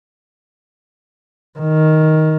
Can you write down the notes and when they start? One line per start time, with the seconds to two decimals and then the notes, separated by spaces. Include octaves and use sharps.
1.59 D#3